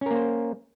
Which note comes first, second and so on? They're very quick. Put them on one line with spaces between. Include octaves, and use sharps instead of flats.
C#4 A#4 A#3 C5